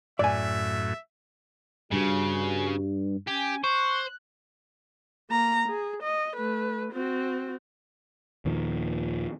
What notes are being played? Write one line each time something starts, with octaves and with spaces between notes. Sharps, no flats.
F#2 A2 D5 E5 G#5
G2 C#3 F#4
C#4 G4 G#5
C5 C#6 F#6
A#3 A#5
G#4
D#5
A3 B4
C4 F#4
D#2 A#2 D#3 F3